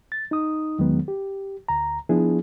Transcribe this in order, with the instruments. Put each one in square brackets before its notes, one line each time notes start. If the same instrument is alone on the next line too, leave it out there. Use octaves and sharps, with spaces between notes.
[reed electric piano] A6
D#4 D#6
E2 D#3 F#3 G#3 B3
G4
D2 A#5
F3 B3 D4 E4 G#4